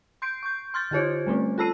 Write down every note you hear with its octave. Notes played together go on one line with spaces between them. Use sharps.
C6 G6 C7 D7
C#6 G6
C6 F6 G6 A6
D3 F4 G4 C5 C#5
G3 A3 C4 C#4
F4 A4 A5 E6 C7 D#7